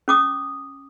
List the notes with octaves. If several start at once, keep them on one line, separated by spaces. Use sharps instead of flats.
C#4 D6 D#6